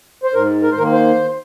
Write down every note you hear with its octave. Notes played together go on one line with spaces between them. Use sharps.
C5
G#2 A#4
A#4
C5
D#3 A#3 A#4
C5